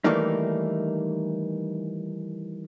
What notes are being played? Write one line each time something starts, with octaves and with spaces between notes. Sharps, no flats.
D#3 E3 G3 A3 A#3 D#4